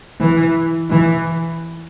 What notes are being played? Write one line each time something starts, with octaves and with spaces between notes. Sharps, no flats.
E3
E3